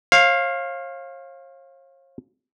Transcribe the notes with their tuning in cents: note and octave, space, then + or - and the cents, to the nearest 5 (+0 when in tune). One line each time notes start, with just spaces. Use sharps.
C#5 -45 F5 +0